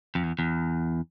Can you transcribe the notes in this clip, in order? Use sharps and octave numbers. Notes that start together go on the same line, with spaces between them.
F2
E2
E2